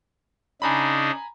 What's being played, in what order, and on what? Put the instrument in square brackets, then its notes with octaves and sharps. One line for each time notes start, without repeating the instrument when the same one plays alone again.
[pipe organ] C#3 D4 D#4 [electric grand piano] G#5 A#5 B5